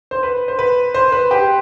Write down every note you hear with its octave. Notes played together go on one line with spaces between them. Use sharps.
C5
B4
C5
B4
C5
B4
G4